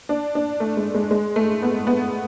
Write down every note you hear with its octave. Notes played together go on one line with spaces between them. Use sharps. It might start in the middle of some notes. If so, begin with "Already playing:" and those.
D4
D4
A3
G#3
G#3
G#3
A3
B3
B3